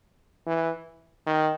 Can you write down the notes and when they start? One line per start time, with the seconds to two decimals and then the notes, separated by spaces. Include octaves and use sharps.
0.46 E3
1.27 D#3